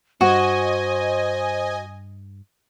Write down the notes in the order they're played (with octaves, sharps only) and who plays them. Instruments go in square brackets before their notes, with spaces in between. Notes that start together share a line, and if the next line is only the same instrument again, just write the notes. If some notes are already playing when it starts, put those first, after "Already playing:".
[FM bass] G2 [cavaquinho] F#4 [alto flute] C5 [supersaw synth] D#5 G#5